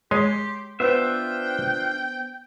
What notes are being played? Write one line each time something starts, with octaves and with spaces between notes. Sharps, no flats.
G#3 G4 C#5 D#5 C6
B3 D4 F4 C5 E5 G5